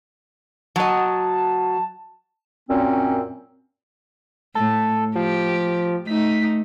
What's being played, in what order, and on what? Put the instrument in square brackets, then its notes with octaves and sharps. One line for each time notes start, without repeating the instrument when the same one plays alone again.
[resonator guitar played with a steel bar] F#3 D#5 [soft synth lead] A5
[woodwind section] F#2 A#2 C4 C#4
[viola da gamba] A2 [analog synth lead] A4
[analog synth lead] F3 [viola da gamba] G4
[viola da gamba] A3 D#4 [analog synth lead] B6